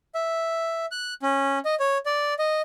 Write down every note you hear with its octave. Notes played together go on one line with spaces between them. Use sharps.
E5
F#6
C#4
D#5
C#5
D5
D#5